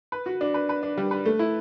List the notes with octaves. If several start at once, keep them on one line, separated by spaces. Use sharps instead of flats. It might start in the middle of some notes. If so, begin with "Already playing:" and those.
B4
F#4
D4
B4
B4
D4
G3
B4
A3
E4